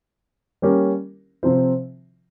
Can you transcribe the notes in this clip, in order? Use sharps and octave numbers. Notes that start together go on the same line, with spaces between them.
G3 A#3 C#4 G4 A#4
C3 F3 C4 F4 C5